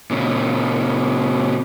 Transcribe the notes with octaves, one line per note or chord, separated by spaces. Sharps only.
A#2 C#3